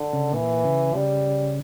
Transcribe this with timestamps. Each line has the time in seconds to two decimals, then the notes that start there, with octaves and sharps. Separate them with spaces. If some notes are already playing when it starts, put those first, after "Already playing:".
Already playing: D3
0.13 C#3
0.33 A#2 E3
0.65 C#3
0.95 C#3 G3